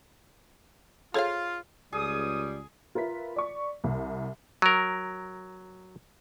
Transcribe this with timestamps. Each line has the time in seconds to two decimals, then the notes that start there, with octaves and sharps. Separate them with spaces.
1.14 F4 G#4 A4 C5 C#5 F5
1.93 C#2 G3 G#4 D#6
2.95 F4 A#4 B4 E5 B6
3.36 D5 C#6
3.84 C2
4.62 F#3 A#4